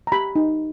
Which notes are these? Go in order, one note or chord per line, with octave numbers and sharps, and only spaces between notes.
A#5
G4 B5
D#4